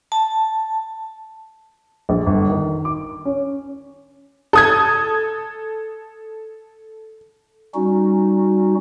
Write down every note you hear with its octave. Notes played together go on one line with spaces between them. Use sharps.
A5
A#1
G1
D#3
D6
C#4
A4 D#6 G#6
G3 C#4 D#4 F#4